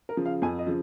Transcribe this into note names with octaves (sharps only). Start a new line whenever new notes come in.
A#4
C#3 F3
F5
F2 G#5
D#5
C#3 F3